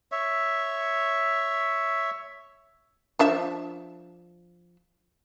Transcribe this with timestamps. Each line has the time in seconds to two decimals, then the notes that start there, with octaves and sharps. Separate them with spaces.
0.12 C#5 E5
3.19 F3 D4 E5